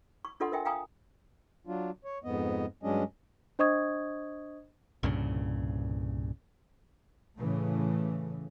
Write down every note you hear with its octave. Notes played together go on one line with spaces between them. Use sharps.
C#6
D4 F4 A4 D#5 F#5 C6
A#4 D#5 E5 G5 G#5
F5 G5 G#5 A#5 D#6
F#3 D4 F4
C#5
F2 G#2 B3 D#5
G2 F#3 G#3 C#4 D4 D#5
D4 C5 D#5 C#6 D#6 G#6
C2 G2 A#2 C#3
A2 C#3 E3 A3